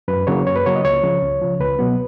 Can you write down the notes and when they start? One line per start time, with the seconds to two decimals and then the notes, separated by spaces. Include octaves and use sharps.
0.08 F#2 B4
0.27 C#3 F#3 A#3 C#5
0.47 F#2 C#5
0.56 B4
0.66 C#3 F#3 A#3 C#5
0.76 D#5
0.85 C#2 C#5
1.03 C#3 F3
1.23 C#2
1.42 C#3 F3
1.60 C#2 B4
1.79 B2 F#3 B3